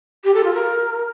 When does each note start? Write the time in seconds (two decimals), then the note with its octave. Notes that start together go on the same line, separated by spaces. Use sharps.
0.24 G4
0.34 A4
0.44 F4
0.53 A#4